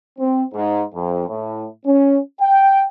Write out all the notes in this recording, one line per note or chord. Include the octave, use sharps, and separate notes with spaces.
C4
G#2
F2
A2
C#4
G5